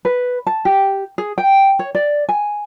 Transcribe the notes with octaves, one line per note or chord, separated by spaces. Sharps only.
B4
A5
G4
G#4
G5
C#5
D5
G#5